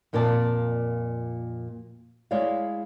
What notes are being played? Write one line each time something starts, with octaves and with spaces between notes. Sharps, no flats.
F2 A#2 A#4 D5 A5
G#3 E4 C#5 D5 F5